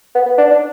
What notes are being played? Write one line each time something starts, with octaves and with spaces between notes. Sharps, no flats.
B3
B3
D4
D4